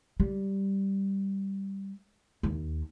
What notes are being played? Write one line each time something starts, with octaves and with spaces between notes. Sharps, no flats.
G3
D#2